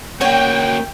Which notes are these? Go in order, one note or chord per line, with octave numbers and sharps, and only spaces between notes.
A#3 C#4 F#4 C#5 G5